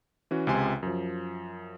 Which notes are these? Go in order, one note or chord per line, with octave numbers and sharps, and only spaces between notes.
E3 C#4 F#4
C#2 C3 G#5 C6
F#2 F3